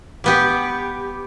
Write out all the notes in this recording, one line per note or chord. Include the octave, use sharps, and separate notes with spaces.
G3 B3 G4